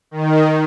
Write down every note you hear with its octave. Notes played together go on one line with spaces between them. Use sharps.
D#3